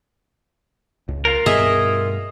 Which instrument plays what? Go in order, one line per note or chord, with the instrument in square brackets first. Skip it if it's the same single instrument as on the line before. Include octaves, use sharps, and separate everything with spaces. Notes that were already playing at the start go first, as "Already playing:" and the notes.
[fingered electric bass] C#2
[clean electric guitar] F4 A#4
[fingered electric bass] G2 B2 B3 [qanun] G#4 D#5 E5